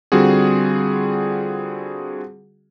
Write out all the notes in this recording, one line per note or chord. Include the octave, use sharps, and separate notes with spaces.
D3 G3 C4 F4 F#4 G#4